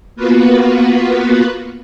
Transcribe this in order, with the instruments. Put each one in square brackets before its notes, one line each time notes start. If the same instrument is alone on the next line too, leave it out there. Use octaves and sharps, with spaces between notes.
[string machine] A#3 B3 F4 F#4 B4